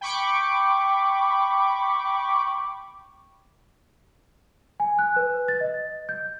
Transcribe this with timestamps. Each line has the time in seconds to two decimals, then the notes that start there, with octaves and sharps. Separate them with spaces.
0.01 G5 B5 C#6 D6
4.80 G#5
4.99 F#6
5.16 B4
5.48 A6
5.61 D#5
6.09 G6